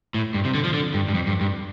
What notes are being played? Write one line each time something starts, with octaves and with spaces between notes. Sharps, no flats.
A2
G2
C3
D3
F3
D3
G2
G2
F2
G2
G2